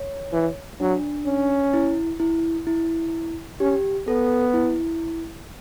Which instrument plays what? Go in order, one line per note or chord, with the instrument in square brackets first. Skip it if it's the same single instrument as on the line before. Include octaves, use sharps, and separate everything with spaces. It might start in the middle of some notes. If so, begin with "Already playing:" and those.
Already playing: [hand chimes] C#5
[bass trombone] E3
[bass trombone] F#3 [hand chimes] D4
[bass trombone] C#4
[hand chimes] E4
E4
E4
[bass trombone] C#4 [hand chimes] G4
[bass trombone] B3 [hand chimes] A4
[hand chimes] E4